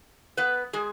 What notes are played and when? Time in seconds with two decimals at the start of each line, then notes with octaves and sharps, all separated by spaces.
0.37 B3 B4
0.73 G#3 G#4